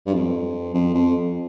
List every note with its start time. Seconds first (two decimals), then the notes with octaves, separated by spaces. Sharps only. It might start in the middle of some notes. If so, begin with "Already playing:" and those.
0.06 G2
0.14 F2
0.74 F2
0.94 F2